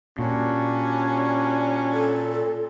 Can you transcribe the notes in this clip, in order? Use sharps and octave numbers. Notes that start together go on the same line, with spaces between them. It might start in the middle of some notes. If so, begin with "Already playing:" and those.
A#2 G3 C#4 D4 F#4
A4